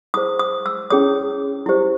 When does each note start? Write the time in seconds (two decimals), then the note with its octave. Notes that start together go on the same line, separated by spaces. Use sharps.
0.14 E4 G#4 C5 D#6
0.39 D#6
0.66 E6
0.90 C#4 E4 G#4 C#5 D#6
1.66 E4 G4 C5